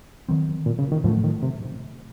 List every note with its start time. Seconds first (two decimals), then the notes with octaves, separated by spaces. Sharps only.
0.29 D#3 F#3 C4
0.66 A#2
0.79 C#3
0.92 D#3
1.04 A2 F3 F#3 A3
1.24 D#3
1.43 C3